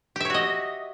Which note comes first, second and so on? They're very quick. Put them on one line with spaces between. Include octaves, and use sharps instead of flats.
G4 E5 C#5 F#4 D#5